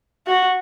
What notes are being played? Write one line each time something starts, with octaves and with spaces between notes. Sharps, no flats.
F#4